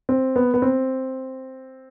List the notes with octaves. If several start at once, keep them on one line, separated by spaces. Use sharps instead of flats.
C4
B3
B3
C4